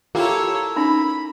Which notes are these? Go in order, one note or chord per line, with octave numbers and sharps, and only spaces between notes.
A#3 E4 F4 G4 A4 C#5
C#4 D#4 B5